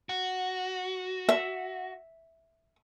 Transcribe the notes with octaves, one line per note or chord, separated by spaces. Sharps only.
F#4
E5